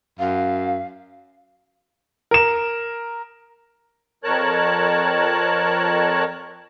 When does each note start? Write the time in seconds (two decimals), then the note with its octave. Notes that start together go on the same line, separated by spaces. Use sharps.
0.19 F#2 F5
2.31 A#4 E7
4.24 F2 A#4 C#5 A5 F#6